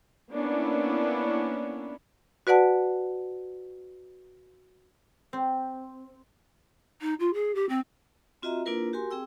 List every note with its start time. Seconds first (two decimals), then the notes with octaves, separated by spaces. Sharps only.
0.30 A#3 B3 C#4 D4 E4
2.47 F#4 B4 D5 F#5 A5
5.33 C4
7.01 D#4
7.20 F4
7.34 G#4
7.55 G4
7.69 C4
8.42 C4 F4 F#4 D#5 E5 A#5
8.66 A#3 D4 E4 F4 A#4 B4
8.93 F#4 G4 A#4 G#5 C6
9.11 C4 G#4 G5 E6